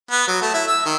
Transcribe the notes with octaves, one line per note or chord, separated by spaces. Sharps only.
B3
F#3
A3
E4
E6
D#3